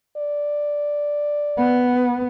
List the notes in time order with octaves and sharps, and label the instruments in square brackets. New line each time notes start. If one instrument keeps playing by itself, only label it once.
[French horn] D5
[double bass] B3